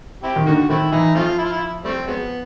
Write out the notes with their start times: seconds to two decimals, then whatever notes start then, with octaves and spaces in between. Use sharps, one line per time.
0.23 C4 E4 G4
0.36 D#3
0.46 D3 A#3 D#4 F#4
0.69 D#3 A3 C4 E4
0.92 E3 D#4
1.15 F3 A3 C4 F4
1.38 E4
1.45 F4
1.52 E4
1.84 G3 A3 C4
2.07 F#3 G#3 B3